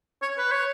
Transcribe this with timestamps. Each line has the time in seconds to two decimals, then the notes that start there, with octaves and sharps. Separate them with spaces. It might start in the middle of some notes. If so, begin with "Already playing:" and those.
0.22 C#5
0.38 B4
0.51 C#5